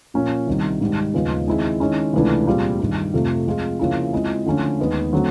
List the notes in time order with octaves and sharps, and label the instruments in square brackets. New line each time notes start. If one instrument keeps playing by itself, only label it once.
[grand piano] A#2 F3 A#3 C#4
C2 C3 D#3 G3
G#2 D#3 G3
D#2 C#3 F3 G#3 B3
D#3 G#3 C4 E4 G#4
D#3 G#3 C#4 E4
C#2 C3 E3 A3 D4
A#2 G3 C4 F4 G#4
G2 D#3 G3
F2 C3 F3 A3
F3 G#3 C4 F4 G#4
C#3 F3 A#3 C#4 E4
F3 G#3 C4 E4
D3 F3 A3 C#4
D#2 D#3 G#3 B3
D3 F#3 A3 C4